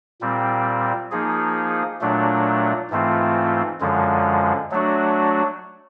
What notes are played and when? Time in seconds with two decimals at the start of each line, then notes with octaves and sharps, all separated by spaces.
0.21 A#2 G3 C4
1.11 F3 A#3 D#4 G#4
2.01 A#2 F#3 A3 D4
2.90 G#2 E3 A3 C4 F4
3.81 F#2 D3 F3 G#3
4.71 F#3 A3 D4 F#4